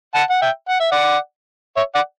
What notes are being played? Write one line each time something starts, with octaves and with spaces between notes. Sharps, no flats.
F#5 A5
F#5
E5 G5
F#5
E5
D5 F#5
C#5 E5
D5 F#5